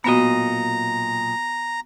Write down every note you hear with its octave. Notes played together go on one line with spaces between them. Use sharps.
B1 A#2 B3 F#4 D#5 A#5